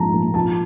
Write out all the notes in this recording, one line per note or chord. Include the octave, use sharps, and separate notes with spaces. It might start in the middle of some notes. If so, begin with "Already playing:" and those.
Already playing: A#1 G#2 F3 A5 A#5
A#3
F3 A5